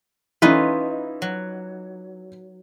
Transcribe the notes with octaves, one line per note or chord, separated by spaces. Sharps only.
E3 C#4 D#4 F4 B4
F#3